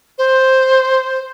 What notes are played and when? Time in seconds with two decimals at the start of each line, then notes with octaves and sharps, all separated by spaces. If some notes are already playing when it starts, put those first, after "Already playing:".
0.18 C5